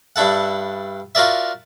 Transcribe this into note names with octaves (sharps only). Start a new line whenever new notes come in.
G2 D4 E4 A4 F#5
F4 F#4 A#4 D5 E5